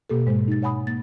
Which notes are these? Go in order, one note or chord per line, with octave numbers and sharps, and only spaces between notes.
B2 A#3 G4 A4
G#2 G#3 C5
D#4 A6
C#5 F#5 G#5 B5 D#6
A#3 A6